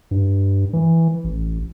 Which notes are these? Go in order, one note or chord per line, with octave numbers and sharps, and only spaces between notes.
G2
E3
A1